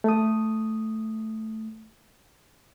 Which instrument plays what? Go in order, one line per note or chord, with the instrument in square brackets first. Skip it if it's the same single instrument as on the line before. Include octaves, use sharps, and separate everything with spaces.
[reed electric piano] A3 D#6